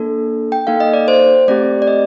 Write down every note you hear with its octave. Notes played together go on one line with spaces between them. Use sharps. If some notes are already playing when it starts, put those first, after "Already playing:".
Already playing: A#3 D4 A4
G5
A#3 D#4 A4 F5
D#5
D5
C5
A3 C4 G4 D5
D5
D#5